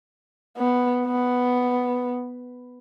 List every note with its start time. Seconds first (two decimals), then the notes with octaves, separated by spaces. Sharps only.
0.58 B3
1.06 B3